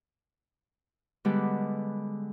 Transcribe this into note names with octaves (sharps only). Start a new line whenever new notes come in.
D3 G3 G#3 B3 G4 B4